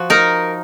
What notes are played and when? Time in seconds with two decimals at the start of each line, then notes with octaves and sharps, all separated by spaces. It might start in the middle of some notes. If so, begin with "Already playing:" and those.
Already playing: F3 F#4
0.10 D#4 A#4